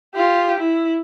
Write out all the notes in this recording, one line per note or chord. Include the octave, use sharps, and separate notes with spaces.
F4 G4
E4